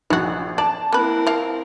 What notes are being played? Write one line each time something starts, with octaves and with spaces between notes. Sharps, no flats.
A#1 F#3 F#4
D5 A5
A#3 C4 E4 A#4 B4
F3 F5